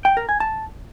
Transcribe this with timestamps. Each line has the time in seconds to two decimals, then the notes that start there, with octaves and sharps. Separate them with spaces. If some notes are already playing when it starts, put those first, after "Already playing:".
0.05 G5
0.17 A#4
0.29 G#5
0.40 A5